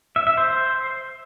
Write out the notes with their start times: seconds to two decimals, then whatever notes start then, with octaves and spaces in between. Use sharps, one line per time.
0.16 E5
0.27 E5
0.37 C5